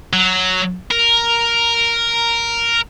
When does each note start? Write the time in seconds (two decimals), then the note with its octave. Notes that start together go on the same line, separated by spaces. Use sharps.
0.13 F#3
0.91 A#4